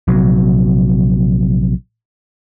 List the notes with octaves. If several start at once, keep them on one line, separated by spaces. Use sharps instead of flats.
A#1 C3 F#3